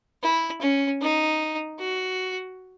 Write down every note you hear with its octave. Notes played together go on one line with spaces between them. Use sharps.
E4
C#4
D#4
F#4